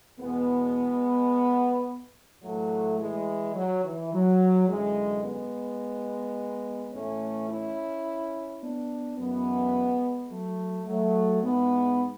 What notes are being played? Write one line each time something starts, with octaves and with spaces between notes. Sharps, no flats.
E2 B2 G#3 B3
A2 E3 F#3 A3
E3 G#3
F#3
E3
F#3
F#2 D3 E3 G#3
G#3 B3
A2 E3 A3 C#4
C#4 E4
B3 D4
F#2 E3 G#3 B3
F#3 A3
F#3 A3
G#2 E3 G#3 B3